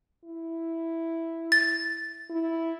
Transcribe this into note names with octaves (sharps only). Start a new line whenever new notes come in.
E4
A6
E4